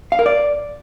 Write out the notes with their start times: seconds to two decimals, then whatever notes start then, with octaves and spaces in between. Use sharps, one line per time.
0.12 F5
0.19 A#4
0.26 D5